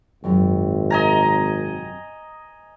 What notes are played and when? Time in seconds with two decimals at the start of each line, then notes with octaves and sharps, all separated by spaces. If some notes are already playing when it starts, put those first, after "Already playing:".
0.24 G#1 F#2 C3 F3
0.90 D#5 G#5 A#5